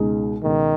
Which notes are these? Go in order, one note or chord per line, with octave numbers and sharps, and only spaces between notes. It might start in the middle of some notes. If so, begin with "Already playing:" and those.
Already playing: C#2 B2 G#3 D#4 G#4
C#2 B2 D#3 G#3